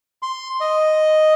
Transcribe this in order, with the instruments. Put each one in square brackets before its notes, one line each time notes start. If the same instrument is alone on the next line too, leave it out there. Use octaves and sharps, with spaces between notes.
[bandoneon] C6
D#5